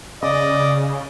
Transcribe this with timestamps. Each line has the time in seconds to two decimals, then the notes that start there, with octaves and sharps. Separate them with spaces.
0.23 C#3 D5 D#5